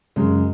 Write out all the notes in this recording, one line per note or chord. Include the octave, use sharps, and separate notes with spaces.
F#2 C#3 G#3